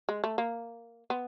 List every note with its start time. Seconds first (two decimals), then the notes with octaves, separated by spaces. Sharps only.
0.09 G#3
0.24 A3
0.38 A#3
1.10 B3